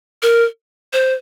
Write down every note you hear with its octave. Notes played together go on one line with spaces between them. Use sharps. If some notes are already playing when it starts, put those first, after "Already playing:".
A#4
C5